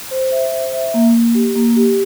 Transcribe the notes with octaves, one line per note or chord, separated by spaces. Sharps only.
C5
E5
C5
E5
A#3
A#3
G4
A#3
G4